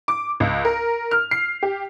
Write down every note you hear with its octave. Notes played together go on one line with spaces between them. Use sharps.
D6
C#2
A#4
F6
C7
G4